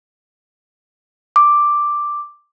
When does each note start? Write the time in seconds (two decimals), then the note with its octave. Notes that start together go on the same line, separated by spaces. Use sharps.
1.36 D6